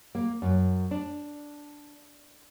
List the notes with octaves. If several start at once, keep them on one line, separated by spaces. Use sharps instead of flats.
A#3
F#2
D4